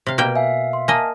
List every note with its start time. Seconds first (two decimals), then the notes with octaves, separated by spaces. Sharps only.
0.07 C3 F5
0.18 B2 A#3 B4 F5 G5
0.36 E5 F5 G#5
0.73 C6
0.88 A#3 D#5 G#5 A5 F6